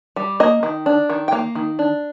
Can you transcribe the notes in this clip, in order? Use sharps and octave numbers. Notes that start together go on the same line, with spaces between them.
G3
A#3 D#5
D#3
D4
D#3
G5
A#3 F5
D#3
D4